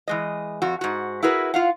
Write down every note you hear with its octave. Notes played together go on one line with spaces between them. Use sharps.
E3 G#3 D#5
F2 F#4
G#2 F#4
E4 F#4 G#4 A#4 B4
F4 F5 F#5